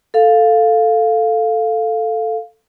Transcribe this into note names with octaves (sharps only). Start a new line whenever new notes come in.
A4 F5